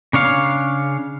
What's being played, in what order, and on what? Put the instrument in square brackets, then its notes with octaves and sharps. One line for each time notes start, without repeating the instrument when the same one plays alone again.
[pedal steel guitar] C#3 D4 C#5 F5